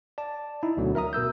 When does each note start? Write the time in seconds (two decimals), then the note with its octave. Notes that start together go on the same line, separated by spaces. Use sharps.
0.18 D5 A5
0.63 D#4 E4
0.77 D2 B2 D3 F#3
0.95 A#4 E5 A#5 D#6
1.13 B2 A#4 E6 G6